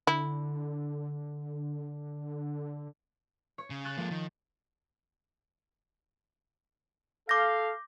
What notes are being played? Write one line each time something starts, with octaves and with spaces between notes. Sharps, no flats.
D3 E4
C#5
C#3
C#6 F#6 A6
F3 G#3 A#3
D#3
A4 F5 D6 G6 A#6